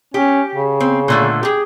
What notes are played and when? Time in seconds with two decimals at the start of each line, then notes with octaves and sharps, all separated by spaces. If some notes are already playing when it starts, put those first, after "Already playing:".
0.14 C#4 G4
0.55 C#3
0.80 C4
1.08 A#2 D3 A3
1.43 G4 G#4